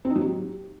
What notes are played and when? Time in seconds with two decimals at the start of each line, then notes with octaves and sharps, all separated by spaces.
0.05 C4
0.10 D#4
0.16 F#3
0.21 G4